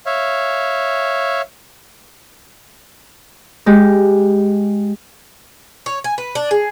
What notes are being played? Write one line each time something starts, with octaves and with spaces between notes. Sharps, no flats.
C#5 E5 F5
G#3 G4
C#5
G#5
B4
D4
G#4